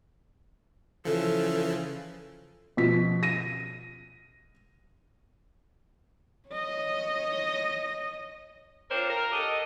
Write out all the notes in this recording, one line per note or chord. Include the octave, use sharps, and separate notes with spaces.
C#3 E3 F3 A4
B2 F3 B6
A#6 D#7
C#5 D#5
C4 D4 F4 A#4 C5 C#5
A#4
D4 G4 A4 D#5